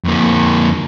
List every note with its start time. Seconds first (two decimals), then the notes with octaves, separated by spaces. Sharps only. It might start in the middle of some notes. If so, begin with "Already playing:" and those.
0.04 F2 A#3